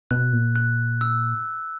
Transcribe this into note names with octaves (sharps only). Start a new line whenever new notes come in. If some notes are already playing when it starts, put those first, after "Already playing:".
B2 F#6
A#2
F#6
E6